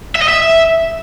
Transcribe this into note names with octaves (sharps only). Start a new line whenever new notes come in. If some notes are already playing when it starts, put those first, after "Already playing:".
E5
D#5
E5